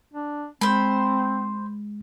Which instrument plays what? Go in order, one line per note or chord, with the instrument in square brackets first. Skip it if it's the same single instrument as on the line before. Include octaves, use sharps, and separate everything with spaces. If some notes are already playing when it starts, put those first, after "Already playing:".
[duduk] D4
[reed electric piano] G#3 [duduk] C4 [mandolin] C5 B5